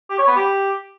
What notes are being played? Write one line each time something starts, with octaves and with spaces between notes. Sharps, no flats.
G4
C#5
B3
G4